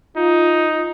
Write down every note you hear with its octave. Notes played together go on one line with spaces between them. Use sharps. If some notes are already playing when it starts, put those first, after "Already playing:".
D#4 F4